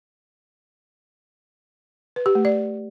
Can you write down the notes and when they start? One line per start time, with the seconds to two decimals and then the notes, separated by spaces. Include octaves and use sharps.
2.16 B4
2.26 G4
2.35 A3
2.45 D5